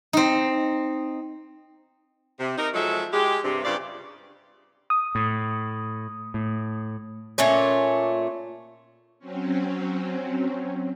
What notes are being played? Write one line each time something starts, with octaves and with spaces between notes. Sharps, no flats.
C4 D#4
C3
D#4 A#4
F3 F#3 G#3 A4 E5
G#3 G4
G2 C3
G2 C#3 F4 G4 C5 D5
D#6
A2
A2
A#2 A3 C#4 C#5
F#3 C4 C#4